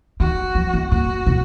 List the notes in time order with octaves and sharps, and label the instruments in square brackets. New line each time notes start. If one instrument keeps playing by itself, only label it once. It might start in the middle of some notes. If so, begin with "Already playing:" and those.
[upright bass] D#3 [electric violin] F#4
[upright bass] F3
E3
[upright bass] A#2 [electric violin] F#4
[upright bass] B2